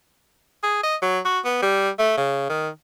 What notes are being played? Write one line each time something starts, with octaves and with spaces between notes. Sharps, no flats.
G#4
D#5
F#3
F#4
B3
G3
A3
C#3
D#3